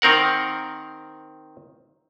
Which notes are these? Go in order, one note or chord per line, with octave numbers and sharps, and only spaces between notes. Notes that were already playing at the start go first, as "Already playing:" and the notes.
D#3 C4 A#4 F#5